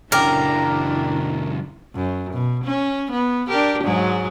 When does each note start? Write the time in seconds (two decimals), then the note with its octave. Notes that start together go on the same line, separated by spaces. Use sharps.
0.12 C#2 F#2 D4 E4 A#4 G5 D6 F6
1.95 F#2
2.34 B2
2.65 C#4
3.12 B3
3.47 D4 G4 A#4
3.84 G#2 F#3 G#3